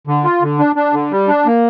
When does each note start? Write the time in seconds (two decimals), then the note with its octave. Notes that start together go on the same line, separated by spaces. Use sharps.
0.07 D3
0.24 F4
0.42 D3
0.59 D4
0.76 D4
0.93 D3
1.11 G3
1.28 D4
1.46 A#3